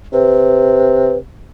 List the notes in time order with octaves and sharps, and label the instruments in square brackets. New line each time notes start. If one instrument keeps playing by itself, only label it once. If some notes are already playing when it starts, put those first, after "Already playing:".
[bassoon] C3 [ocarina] B4